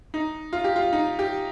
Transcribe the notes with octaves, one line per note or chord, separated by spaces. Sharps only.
D#4
F4
G4
F4
D#4
G4